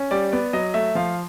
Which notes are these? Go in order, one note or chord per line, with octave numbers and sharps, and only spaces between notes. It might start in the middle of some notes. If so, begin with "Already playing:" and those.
Already playing: C#4
G3 D5
B3 D5
F#3 D#5
A3 E5
F3 F5